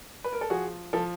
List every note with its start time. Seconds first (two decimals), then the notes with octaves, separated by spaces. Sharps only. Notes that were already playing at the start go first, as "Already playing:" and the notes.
0.24 B4
0.33 A#4
0.41 A4
0.50 F3 F#4 G#4
0.93 F3 A4